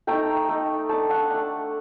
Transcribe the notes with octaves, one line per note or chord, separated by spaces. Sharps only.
A3 D#4 G5 A#5
A3 D#4
A3 D4 A5 C6
F#5 A5
A3 D4